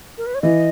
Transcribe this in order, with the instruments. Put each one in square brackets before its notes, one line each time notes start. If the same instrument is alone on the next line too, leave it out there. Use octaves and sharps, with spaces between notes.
[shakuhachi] A#4
B4
C#5
[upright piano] E3 [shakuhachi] D#5